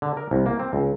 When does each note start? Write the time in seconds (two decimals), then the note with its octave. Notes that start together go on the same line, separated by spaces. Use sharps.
0.02 D3
0.17 A#4
0.31 C2
0.46 A#3
0.59 C4
0.73 C#2